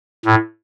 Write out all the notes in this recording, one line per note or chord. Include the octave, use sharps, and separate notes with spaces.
A2